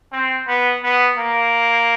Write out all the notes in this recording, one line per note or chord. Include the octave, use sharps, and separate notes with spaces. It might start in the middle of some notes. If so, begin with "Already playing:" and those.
C4
B3
B3
A#3